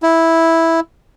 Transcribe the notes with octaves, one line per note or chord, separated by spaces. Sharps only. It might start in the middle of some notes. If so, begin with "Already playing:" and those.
E4